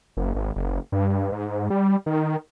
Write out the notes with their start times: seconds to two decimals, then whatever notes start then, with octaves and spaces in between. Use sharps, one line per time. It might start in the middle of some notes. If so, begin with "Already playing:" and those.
0.17 F#1
0.35 G#1
0.56 F#1
0.92 G2
1.32 G#2
1.70 G3
2.06 D#3